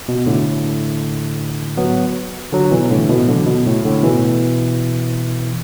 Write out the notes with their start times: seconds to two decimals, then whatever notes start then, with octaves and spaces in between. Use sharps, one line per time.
0.08 B2
0.26 A2 D3
1.77 F#3 B3
2.52 D3 F#3
2.71 B2 E3
2.91 A2 D3
3.09 B2 E3
3.28 D3 F#3
3.46 B2
3.66 A2
3.85 A2 D3
4.03 B2 E3